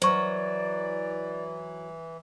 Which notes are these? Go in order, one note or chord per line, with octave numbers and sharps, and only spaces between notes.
E3 F#3 C5 D5 C#6